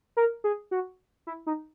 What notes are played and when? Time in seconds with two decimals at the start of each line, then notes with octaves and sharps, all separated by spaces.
0.17 A#4
0.44 G#4
0.71 F#4
1.27 E4
1.47 D#4